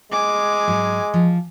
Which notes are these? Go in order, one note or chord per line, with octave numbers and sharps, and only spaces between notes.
G#3 G#5 D6
G#2 F#3 F#4
F3